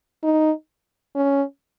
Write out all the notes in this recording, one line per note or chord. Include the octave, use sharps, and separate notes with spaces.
D#4
C#4